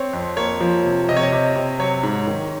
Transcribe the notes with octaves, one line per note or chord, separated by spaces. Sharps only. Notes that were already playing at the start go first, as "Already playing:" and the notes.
Already playing: C4 C#5
F2
A#3 C#5
F3
C3
C3 D#5
C#5
D#5
C3
C3
F#3 C#5
G#2
D#3